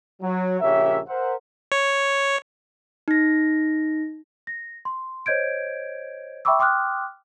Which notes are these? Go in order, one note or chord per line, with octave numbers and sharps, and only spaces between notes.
F#3
A#1 C#3 G4 A#4 C#5 E5
A#4 C5 E5 F#5
C#5
D#4 A#6
A#6
C6
C5 C#5 D#5 G6 G#6 D7
E5 G5 B5 C#6 D6 E6
G5 C6 D6 D#6 F6 F#6